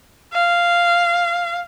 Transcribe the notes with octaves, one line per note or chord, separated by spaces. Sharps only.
F5